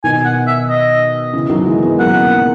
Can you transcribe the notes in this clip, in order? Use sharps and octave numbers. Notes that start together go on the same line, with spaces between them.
B2 D#3 G#5
F#5
E5
D#5
C#3 E3
D#3 F#3
E3 G#3
G#3 B3
F#3 A#3 F#5